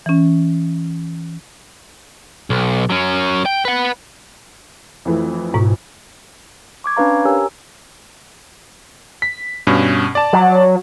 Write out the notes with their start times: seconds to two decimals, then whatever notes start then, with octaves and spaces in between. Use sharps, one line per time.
0.06 E3 C#4
2.50 B1
2.90 F#3 C#4
3.45 G5
3.65 B4 F#5
5.05 F2 E3 A3
5.54 G#2 B2
6.84 C#6 D6 G#6
6.97 C#4 D4 B4 F5 A#5
7.25 G4 A#4 C#5 G#5 A#5 E6
9.22 B6
9.67 G2 B2 C#4
10.15 D5 A5
10.33 F#3